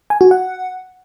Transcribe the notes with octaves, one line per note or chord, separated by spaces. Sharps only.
G#5
F#4
F#5